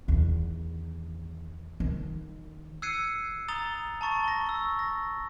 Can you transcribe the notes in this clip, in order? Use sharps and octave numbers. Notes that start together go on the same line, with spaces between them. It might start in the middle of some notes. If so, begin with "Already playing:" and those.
E2 D#3
D#3
E6 F#6 G#6 C7 C#7 D#7
A#5 D#6 A6 F7 G7
A5 A#5 C#6 A6
A#6 G7
C#6 E6
A#6